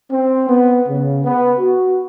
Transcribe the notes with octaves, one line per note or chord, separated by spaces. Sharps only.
C4
B3
C#3
B3
F#4